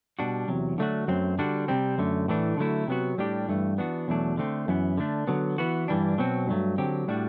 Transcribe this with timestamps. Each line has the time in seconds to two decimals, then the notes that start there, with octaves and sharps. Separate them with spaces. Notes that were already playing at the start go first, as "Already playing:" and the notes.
0.19 B2 G3 D4 F#4
0.48 E2 C3 F#3
0.78 D3 F#3 A3 D4 F#4
1.08 F#2 F#3 A3 C4
1.39 D3 G3 D4 F#4
1.68 C3 G3 C4
1.98 F#2 D3 A3
2.28 A2 E3 A3 D4
2.58 D3 F#3 A3 E4
2.88 C3 F#3 B3 F#4
3.18 A2 G3 D4 G4
3.49 G2 E3 A3
3.78 E3 B3 D4 F#4
4.08 E2 B2 F#3 A3 D4
4.37 D3 A3 C4
4.68 F#2 E3 B3
4.97 D3 A3 D4
5.27 D3 F#3 B3
5.58 E3 B3 F#4
5.88 G2 E3 G3 D4
6.18 B2 F#3 C4 F#4
6.48 G2 F#3 A3
6.78 D3 F#3 C4 G4
7.08 A2 G3 D4 F#4